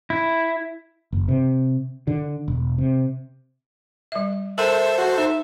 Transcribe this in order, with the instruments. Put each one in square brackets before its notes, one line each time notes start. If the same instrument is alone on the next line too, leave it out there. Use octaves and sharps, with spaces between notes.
[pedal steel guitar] E4
[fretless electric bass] F#1
C3
D3
E1
C3
[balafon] G3 E5
[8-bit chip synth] A4 C5 [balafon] A#4 G5 A#5 [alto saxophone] E5
[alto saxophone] F#4
[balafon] D#4 [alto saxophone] E5